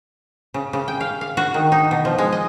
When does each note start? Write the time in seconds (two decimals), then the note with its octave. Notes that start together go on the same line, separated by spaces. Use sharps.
0.54 C#3
0.73 C#3
0.88 G5
1.01 F5
1.21 F5
1.37 F#4
1.54 D#3
1.72 D#4
1.91 B2
2.05 F3
2.18 G#3
2.33 D#5